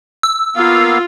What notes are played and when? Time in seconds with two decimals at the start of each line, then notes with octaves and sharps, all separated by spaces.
0.23 E6
0.56 A#3 B3 F4 F5